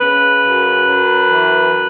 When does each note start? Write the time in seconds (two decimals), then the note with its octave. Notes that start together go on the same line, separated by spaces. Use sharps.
0.01 C#3 B4
0.45 F#2
0.88 F#2
1.31 E3